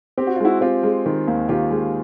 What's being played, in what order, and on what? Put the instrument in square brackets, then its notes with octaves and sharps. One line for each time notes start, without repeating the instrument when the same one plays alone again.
[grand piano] C4 [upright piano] G4
[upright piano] F#4
F4
[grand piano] G#3 [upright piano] E4 F#4
[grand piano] C4 [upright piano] F4 G4
[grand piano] G#3
D#3
D#2
[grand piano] D#3 [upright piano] F4 G4
[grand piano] G#3